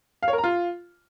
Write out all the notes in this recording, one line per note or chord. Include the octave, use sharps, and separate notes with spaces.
F5
C#5
A#4
A#5
F4